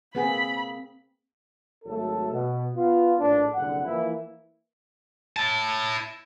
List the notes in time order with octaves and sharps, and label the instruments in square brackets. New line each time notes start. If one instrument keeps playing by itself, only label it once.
[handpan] A#3 C4 G#4 [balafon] B4 F#5 G#5 [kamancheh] B5
[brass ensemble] G#1 F#3 A3 A4
B2
B3 F4
A#1 A2 D4
F#1 C2 D3 F#5
E3 F3 A#3 E4
[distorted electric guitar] E4 A5